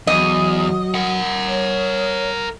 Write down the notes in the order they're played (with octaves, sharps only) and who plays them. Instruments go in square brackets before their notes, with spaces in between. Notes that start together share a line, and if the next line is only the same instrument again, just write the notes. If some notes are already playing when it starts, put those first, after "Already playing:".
[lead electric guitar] E2 [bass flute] F#3 [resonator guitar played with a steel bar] D#5
[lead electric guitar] A#4 F#5
[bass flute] C#5